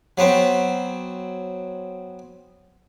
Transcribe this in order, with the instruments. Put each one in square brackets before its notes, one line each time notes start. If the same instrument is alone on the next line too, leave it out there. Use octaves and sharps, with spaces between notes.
[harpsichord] F#3 B3 C4